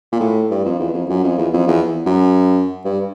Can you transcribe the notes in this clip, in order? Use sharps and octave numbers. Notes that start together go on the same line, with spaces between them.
A#2
A2
G2
F2
E2
F2
F#2
F2
E2
F2
E2
F#2
G2